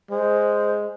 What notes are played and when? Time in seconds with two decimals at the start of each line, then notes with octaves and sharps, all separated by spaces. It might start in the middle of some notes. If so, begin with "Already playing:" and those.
0.11 G#3 C5